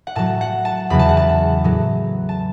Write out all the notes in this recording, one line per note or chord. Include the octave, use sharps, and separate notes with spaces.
F#5
A2 F#3 A5
F#5
A5
E2 C#3 F#3 B5
A5
F#5
A5
A2 F#3
A5